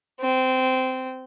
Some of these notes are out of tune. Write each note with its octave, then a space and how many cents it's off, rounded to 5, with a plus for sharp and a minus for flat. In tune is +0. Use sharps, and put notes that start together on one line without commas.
C4 -15